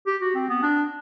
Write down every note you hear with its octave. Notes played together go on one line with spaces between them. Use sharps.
G4
F#4
C4
B3
D4